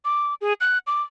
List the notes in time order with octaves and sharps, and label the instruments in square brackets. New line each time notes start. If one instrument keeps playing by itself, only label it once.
[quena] D6
G#4
F#6
D6